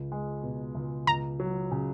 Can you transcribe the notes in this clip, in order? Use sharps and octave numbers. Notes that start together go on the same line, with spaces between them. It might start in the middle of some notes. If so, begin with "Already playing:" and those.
Already playing: C#2
G#3
B2
C#2
C#2 A#5
F#3
C#3